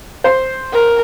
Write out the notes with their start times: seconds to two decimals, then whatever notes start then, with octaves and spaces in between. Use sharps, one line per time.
0.24 C5
0.73 A#4